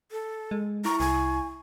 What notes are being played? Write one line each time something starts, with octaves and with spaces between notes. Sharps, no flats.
A4
G#3
E4 A#5 C#6
C2 G#5